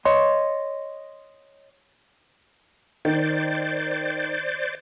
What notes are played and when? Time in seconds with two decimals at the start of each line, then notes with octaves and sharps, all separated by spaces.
0.05 C#5 D#5 C6
3.05 D#3 C5 D5